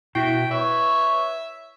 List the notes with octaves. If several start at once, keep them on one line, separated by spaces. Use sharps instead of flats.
B2 E4 F#4 E5 G5
B4 C#5 E5